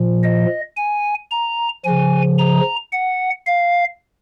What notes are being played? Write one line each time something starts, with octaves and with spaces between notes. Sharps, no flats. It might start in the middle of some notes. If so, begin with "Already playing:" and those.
Already playing: A#2 F3
D#5
G#5
A#5
C#3 F3 G#5
A#5
F#5
F5